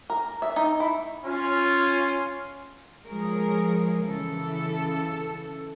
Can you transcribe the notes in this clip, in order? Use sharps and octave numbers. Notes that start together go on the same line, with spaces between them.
A#4
E5
D#4
E4
C#4 F4
F3 G#3 G#4 A#4 C#5
C#3 E3 A4